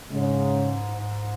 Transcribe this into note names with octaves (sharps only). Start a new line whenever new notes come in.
G#2 C#3 G#3 C#4
G#2